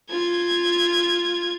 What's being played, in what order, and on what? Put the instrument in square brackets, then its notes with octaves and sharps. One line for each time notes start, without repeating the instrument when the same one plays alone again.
[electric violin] F4 G#6